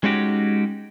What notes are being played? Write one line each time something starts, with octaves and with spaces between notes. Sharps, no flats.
G#3 C#4 D#4 F#4 G4